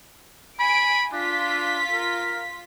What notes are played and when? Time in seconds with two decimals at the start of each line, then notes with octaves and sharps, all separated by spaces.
0.59 G#5 B5 D7
1.13 D4 F4 B6
1.91 A#4